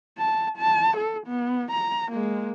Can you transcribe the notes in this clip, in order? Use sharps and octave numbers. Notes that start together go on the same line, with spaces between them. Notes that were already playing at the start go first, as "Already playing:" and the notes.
A5
A5
A4
B3
A#5
G#3 A#3